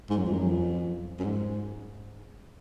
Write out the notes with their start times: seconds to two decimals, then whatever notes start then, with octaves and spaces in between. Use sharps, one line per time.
0.10 G#2
0.18 F#2
0.26 F2
0.33 F#2
0.48 F2
1.20 F#2
1.25 G#2